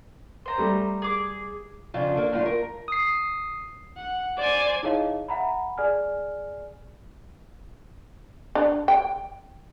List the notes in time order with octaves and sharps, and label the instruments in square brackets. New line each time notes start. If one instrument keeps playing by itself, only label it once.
[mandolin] C5 A#5
[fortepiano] G3 A3
[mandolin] G#4 D6
[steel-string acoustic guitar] F2 C#3 D4 F4
A#3 D4 A4
F#2 A2 D4 F4
A#4
[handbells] D#6 C7
[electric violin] F#5
[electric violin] C5 G#5 [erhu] D5
[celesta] D#4 E4 G#4 C#5 D#5 F5
E5 F#5 A#5 B5
G#4 D5 G#5 F6
[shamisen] D4
G5